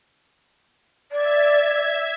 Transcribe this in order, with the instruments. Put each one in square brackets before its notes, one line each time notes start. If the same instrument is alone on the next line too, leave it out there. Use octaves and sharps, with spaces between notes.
[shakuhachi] D5 [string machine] E5 G#6